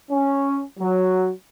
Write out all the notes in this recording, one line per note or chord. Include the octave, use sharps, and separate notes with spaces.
C#4
F#3